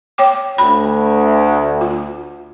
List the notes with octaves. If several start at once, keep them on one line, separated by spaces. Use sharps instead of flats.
C#5 G5 D6
D2 B5
F4